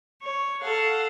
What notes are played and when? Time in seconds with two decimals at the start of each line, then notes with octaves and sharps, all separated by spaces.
0.21 C#5
0.62 A4 F5 F#5